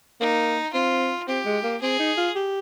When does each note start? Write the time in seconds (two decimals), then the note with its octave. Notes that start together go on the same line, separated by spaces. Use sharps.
0.20 A#3 D#4
0.73 C4 F4
1.28 C4 G4
1.45 G#3
1.63 A#3
1.81 C4 G#4
1.99 D#4
2.17 F4
2.35 G4